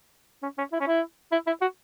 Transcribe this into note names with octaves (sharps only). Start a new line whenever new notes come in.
C#4
C#4
E4
C#4
E4
E4
E4
F#4